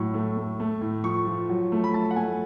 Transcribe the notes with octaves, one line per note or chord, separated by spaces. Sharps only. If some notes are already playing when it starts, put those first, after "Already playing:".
Already playing: A2 F#3 C#6
A3
A3
A3
A2
F3 C#6
F3
F#3
A3
B5
A3 A5
F#5
A3 G#5